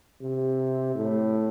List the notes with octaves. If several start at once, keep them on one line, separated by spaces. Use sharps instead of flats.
C3
A2